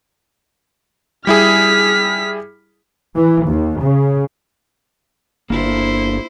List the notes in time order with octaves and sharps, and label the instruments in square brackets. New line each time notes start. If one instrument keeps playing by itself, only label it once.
[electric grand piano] G3 E4 G#4 [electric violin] F6 B6
[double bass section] E3
D#2
C#3
[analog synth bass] G1 [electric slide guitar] A#3 D4 F4 [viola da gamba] E4 C5